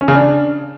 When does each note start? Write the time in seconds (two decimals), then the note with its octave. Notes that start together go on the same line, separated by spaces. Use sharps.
0.01 C#4
0.08 C#3
0.15 D4